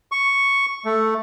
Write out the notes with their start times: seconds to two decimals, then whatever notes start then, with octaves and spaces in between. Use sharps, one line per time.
0.12 C#6
0.85 A3